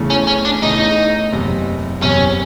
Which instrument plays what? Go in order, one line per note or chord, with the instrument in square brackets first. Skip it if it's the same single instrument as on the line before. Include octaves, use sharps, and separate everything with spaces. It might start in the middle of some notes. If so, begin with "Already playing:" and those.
Already playing: [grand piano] E2 C#3 E3 A3
[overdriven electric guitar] C#4
C#4
D4
[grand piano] E2 C#3 E3 A3 [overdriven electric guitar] D#4
[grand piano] F#1 E2 C3
[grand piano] F#1 E2 C3 [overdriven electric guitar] C#4